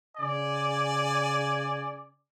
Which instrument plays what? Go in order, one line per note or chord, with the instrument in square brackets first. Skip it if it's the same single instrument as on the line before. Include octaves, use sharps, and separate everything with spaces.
[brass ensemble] C#3 D5 G#5